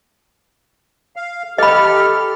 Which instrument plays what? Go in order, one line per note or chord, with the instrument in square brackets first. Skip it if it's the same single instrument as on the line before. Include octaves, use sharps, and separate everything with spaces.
[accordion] F5
[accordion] G4 A4 F6 [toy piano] D#5 B5